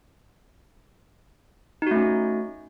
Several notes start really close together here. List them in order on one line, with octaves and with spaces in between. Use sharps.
D#4 F#4 A3 C#4